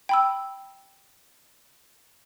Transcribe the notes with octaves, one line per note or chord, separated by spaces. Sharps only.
G5 B5 E6